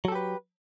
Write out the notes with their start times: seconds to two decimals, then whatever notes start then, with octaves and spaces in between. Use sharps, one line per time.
0.05 F#3
0.08 A4
0.12 G4
0.15 B4